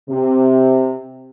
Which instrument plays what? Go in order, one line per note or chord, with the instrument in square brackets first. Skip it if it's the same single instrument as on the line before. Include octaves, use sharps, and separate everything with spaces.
[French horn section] C3